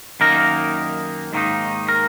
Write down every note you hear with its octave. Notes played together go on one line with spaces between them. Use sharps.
F#2 D#3 A#3 D#4 A#4 A#5
G#2 D#3 A#3 D#4
A#4 A#5